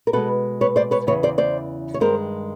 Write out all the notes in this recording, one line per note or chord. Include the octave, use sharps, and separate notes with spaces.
A#4
B2 G#3 A4 B4
B4 C#5
C5 D5
B4 C#5
E2 C#3 E3 B4 C#5
C5 D5
C5 D5
C#5
G2 D#3 G#3 A#4 C5